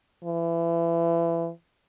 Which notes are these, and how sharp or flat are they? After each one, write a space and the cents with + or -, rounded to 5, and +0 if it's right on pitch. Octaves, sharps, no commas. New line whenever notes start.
E3 +30